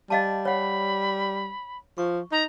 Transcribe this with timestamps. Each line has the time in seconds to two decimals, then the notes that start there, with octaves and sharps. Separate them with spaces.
0.10 G3 D#5 F5 A5
0.45 C#5 F#5 B5
1.98 F3 C#6
2.32 D#4 A#5